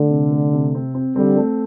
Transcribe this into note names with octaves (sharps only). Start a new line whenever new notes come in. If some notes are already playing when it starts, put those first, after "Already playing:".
Already playing: D3 A3
C3
A3
C3
C4
C4
D3 G3 C4
A3